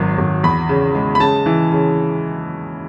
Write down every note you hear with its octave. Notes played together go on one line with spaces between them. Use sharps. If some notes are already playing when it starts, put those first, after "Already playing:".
Already playing: G#1 F#3
G#1
E2 B5
C#3
G#3
B5
C#3 A5
E3
C#3